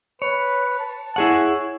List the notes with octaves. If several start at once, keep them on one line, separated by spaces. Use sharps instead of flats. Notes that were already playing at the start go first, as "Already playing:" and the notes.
B4 C#5
A5
E4 G#4 C#5 F#5